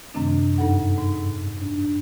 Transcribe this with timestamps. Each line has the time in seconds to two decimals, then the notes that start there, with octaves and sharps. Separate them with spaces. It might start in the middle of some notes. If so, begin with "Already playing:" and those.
0.14 F#2 C3 D#3 A3 C4 D4
0.58 G2 D#4 A4 F#5
0.98 G#2
1.61 D4